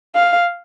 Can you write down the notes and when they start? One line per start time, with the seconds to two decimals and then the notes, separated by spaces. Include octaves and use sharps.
0.15 F5